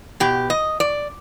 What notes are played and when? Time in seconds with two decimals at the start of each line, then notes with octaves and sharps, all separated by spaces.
0.20 B2 G4
0.50 D#5
0.80 D5